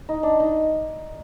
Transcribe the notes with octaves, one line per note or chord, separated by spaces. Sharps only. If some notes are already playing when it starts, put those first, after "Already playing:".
D#4
D4
D#4